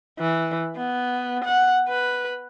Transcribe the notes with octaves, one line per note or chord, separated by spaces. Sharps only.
E3
B3
F#5
B4